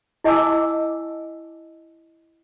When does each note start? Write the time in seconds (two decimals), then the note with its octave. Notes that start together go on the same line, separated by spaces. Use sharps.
0.24 E4 D#5 G#5 A5 D6 E6